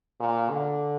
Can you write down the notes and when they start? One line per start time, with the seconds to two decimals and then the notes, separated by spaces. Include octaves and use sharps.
0.20 A#2
0.50 D3